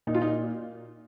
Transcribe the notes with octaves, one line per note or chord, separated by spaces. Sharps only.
A#2 D#4
F4
D#4